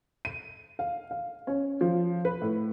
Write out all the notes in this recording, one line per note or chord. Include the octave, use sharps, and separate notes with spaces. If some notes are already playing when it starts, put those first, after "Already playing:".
D#7
F5
F5
C#4
F3
B4
A2